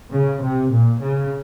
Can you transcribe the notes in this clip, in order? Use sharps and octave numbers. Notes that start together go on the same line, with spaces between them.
C#3
C3
A#2
C#3